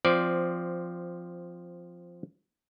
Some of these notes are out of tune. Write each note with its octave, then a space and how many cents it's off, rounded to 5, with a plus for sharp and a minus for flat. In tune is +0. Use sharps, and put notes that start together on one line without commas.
F3 +0 C4 -10 D5 +0